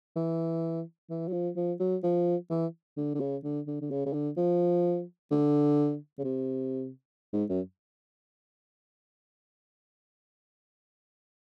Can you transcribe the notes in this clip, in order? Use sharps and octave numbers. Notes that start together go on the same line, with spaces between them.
E3
E3
F#3
F3
F3
F#3
F3
E3
D3
D3
C#3
D3
D3
D3
C#3
C#3
D3
F3
D3
C#3
C3
G#2
F#2